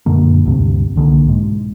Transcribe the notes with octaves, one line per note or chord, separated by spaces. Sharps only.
F#2 A#2 D3 A#3
G#1 D2 G2 C3
C2 D3 F3 A#3
B1 G#2